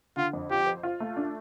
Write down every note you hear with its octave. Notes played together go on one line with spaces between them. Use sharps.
D3 F4
F2
F4 G4
C5
F4
A3
D4